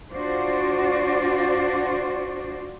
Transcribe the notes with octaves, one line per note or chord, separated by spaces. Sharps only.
D4 F4 F#4 C5 D5